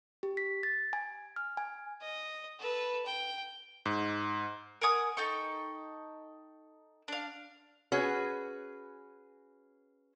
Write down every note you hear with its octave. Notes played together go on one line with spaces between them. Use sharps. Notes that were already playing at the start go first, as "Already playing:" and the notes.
G4
B6
A6
G#5
F6
G#5
D#5
A4 B4
G5
G#2
A#4 F#5 G#5 D#6
D#4 A4 G5 C#6
D4 F5
C#4 F#4 G#4 B4